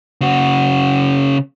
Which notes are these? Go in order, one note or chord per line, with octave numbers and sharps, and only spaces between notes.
C#3 F#4